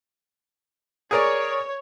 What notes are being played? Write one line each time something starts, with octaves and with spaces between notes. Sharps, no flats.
G#4 A#4 C#5 D5